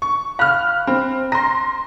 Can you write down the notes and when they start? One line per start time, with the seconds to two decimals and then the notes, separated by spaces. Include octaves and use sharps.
0.02 C#6
0.39 F5 B5 F6 F#6
0.87 C4 B5
1.32 A#5 C6 A#6